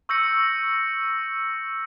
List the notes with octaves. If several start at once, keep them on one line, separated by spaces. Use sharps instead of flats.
C#6 E6 G6 A#6 C#7